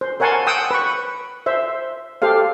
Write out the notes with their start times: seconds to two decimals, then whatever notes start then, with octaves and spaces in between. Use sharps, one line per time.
0.01 C5
0.20 A#4 C#5 F#5 G#5 A5 C6
0.47 F#5 G5 D#6 E6
0.71 B4 C#6
1.46 C5 E5
2.22 G4 A4 C5 F5